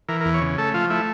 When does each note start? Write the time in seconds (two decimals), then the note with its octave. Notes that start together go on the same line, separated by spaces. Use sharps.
0.08 E3 A#4
0.21 A#4
0.25 E2
0.34 C#5
0.41 C#3
0.58 A3 A4
0.74 F3 F4
0.90 A3 E4